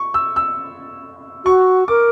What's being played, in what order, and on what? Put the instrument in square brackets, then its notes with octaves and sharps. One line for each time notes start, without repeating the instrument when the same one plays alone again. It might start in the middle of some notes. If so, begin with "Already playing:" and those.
Already playing: [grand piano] C#6
E6
E6
[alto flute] F#4 [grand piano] C#6
[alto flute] A#4 [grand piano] D6